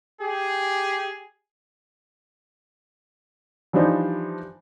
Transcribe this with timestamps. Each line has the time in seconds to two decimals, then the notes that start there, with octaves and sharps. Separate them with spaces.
0.21 G4 G#4
3.73 E3 F3 G3 D4 D#4 C5